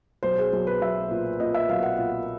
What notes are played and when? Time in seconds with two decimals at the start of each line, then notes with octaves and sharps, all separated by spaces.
0.23 B1 C5
0.38 G#4
0.53 B1
0.67 B4
0.81 B1 E5
1.11 A#2
1.40 A#2 D#5
1.54 E5
1.69 B1 F5
1.83 F#5
1.98 A#2 F5